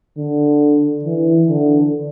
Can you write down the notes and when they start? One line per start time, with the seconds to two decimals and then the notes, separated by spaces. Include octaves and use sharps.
0.18 D3
1.05 E3
1.48 D3